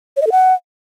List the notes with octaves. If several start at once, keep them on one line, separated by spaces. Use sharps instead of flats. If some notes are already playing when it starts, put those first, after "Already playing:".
C#5
D#5
A4
F#5